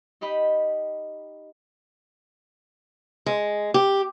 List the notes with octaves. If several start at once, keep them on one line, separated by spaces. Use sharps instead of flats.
D#4 G4 D#5 B5
G#3
G4